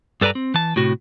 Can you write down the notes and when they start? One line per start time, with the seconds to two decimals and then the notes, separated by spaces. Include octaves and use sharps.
0.21 G2 A4 B4 D5 G#5 A#5
0.35 C4
0.54 E3 A5
0.76 A2 C3 F#4